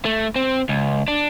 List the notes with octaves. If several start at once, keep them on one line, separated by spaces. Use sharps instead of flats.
A3
C4
C#2
D4